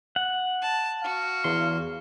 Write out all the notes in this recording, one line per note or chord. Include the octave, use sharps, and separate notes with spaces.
F#5
A5
F#4 F5
E2 C6